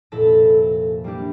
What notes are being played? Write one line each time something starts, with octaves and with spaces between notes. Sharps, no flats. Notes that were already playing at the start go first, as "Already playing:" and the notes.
F1 A#2 E4 A4 A5 A#6
G3 A#3 D4 E4 G4